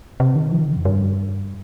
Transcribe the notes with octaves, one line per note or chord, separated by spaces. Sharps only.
C3
D#3
F3
D#3
C#3
F2
G2